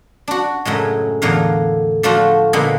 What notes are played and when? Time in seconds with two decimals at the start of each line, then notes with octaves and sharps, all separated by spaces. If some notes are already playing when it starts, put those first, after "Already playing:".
0.28 D4 F#4
0.65 F#2 A2 C#3 G#3
1.22 E2 A2 D3 A#4 F5
2.03 F3 A3 D4 F4 F#4
2.53 A#2 D3 G#3 A#3 B3 G#4